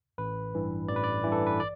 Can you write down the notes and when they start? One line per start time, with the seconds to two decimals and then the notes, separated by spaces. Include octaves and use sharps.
0.18 A1 B4
0.54 G2 E3
0.88 A1 D5
0.96 B4
1.04 D5
1.24 G2 E3
1.32 A4
1.47 B4
1.60 D5